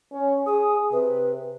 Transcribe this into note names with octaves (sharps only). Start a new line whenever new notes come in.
C#4
G#4 D#6
C3 B4